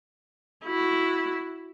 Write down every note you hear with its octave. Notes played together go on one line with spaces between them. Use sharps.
E4 F#4